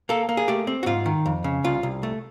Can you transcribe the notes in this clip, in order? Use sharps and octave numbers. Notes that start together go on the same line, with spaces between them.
A#3 A4
A#3
G#4
A3 G4
C4
F#4
G#2 F4
D#3
F2
C#3
C2 F4
C2
A3